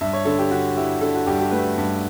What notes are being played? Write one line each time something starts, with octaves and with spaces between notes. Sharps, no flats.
G2 E5
C#5
D3 A4
G4
D3 F#4
E4 G4
D3 A4
F#4
G2 G4
G4
A3 B4
G2